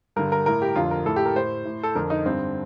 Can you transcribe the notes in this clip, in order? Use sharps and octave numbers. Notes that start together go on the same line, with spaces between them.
G2 D3 A#4
A#4
A2 A#4
G4
F2 D3 F4
A#4
A2 A4
G4
A#4
A2 C5
A2
A4
F2 D3 A#4
D#4
G2 D3 C4